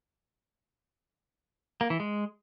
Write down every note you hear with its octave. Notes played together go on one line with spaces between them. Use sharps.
A#3
E3
G#3